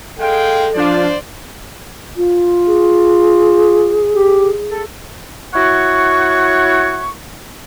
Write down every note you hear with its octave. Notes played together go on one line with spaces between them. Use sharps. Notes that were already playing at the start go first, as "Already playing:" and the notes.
G#3 A4 F5 G5
F3 D4 F4 C5 D5
F4
G#4
G4
A4
E4 F#4 C#5 F#5 C#6